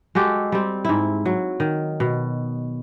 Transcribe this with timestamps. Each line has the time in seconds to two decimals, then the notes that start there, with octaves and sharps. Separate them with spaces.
0.15 G#3 F#4 G4 A4
0.52 G3 C4
0.85 G#2 E4
1.26 F#3
1.60 D#3
2.00 B2